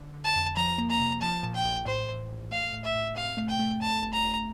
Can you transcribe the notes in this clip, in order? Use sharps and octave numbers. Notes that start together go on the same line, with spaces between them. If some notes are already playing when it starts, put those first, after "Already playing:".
Already playing: D3
D3
A5
F2
F3 A#5
A#3
A#5
C3
F3 A5
A#2
G5
A#1
A2 C5
E3
A#1
A3 F5
A2
E5
A2
C3 F5
A3
G5
A3
F2 A5
G1
A#5
G1